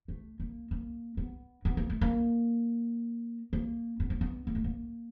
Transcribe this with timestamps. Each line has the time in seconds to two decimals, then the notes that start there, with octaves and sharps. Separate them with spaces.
0.08 A3
0.40 A#3
0.71 A#3
1.17 B3
1.65 B3
1.77 A#3
1.90 A3
2.01 A#3
3.53 A#3
4.00 B3
4.10 A#3
4.21 B3
4.47 A#3
4.55 A3
4.64 A#3